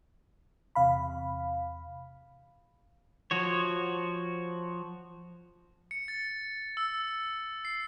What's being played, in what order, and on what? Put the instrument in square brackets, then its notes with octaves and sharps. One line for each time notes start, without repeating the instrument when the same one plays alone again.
[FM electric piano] E2 C3 F5 B5
[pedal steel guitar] F3 F#4 C#5
[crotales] C#7
A6
E6
C7